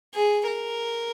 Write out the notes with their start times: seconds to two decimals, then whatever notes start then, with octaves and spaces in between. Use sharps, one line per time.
0.14 G#4
0.47 A#4